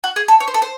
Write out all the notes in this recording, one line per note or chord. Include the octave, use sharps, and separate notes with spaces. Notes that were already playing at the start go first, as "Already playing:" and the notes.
F#4
G#4
A4
C#5
C5
A4
C5